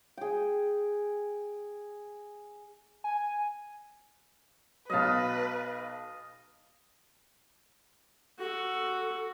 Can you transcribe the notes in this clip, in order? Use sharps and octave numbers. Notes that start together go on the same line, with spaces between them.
G#4 G5
G#5
B1 F#3 B4 D#5 F5 A5
F#4 A4